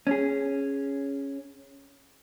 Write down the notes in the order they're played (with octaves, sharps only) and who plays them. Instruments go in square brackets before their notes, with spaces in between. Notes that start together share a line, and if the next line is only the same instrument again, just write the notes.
[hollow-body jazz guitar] C#4 G#4